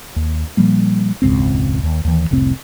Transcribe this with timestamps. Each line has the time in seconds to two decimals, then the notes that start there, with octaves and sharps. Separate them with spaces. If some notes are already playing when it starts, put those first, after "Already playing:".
0.16 D#2
0.57 A#2 F3 G3 A#3
1.22 E1 C#2 G#2 C4
1.83 D#2
2.05 D#2 E3
2.31 F1 C2 A2 C4